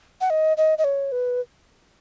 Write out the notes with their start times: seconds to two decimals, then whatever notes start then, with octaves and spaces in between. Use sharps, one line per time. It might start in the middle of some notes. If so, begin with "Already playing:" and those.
0.21 F#5
0.30 D#5
0.57 D#5
0.78 D#5
0.84 C#5
1.12 B4